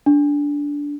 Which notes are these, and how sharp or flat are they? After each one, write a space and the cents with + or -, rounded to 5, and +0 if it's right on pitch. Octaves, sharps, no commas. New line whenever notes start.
D4 -15